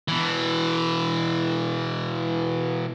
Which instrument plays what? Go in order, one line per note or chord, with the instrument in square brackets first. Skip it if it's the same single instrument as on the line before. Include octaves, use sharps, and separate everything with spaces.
[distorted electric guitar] B2 E3